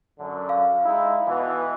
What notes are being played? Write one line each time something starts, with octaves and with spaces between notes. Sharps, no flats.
F#2 D3
F5
G#3 D#4 E4
B2 E3